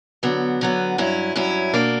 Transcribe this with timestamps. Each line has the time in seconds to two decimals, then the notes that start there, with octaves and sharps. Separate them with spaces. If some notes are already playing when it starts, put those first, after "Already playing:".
0.23 D3 F#3 B3
0.61 D3 F#3 B3
0.98 G2 F#3 C#4 E4
1.36 G2 F#3 C#4 E4
1.73 B2 A#3 D4